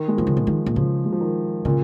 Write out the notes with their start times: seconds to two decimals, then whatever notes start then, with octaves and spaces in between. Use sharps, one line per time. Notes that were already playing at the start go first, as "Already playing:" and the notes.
Already playing: D#3
0.08 G#3
0.17 A#2 F3
0.27 C#3
0.37 A#2
0.47 D#3 G#3
0.66 A#2
0.76 C#3 F3
1.05 G#3
1.12 F3
1.21 D#3
1.65 A#2 C#3